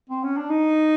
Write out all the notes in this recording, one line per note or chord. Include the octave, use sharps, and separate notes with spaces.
C4
C#4
D4
D#4